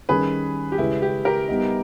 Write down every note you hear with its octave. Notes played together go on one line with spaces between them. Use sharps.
D#3 G3 C#4 G4 G#4 A#4 B4
G4
C#3 G#3 C#4 E4 G#4 B4
G4
G4 A#4
G3 B3 D#4